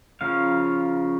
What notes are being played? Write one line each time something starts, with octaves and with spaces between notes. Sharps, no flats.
C#3 F3 A#3 C#4 F5